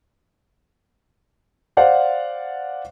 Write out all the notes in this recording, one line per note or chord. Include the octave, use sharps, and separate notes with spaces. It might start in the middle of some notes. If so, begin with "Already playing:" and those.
C5 D5 F5 F#5